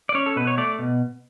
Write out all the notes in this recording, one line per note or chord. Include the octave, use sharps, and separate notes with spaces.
D5
C#4 C#5
A4
B2 B4
C#5
A3 D5
B2